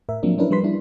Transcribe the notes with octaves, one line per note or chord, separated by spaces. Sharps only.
A2 A#4 E5
F3 F#3 A#3 C4 D4
F#3 C#4 D4 E4 A#4 B4
F3 G3 D4 B4 C6 B6
G3 D4 E4